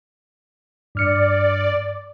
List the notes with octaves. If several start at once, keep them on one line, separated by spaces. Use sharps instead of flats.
G2 D5 F6 C#7